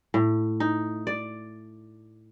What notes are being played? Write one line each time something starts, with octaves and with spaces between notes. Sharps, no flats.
A2
D#4
D5